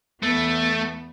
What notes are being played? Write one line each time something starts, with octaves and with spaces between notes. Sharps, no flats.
E2 A3 B3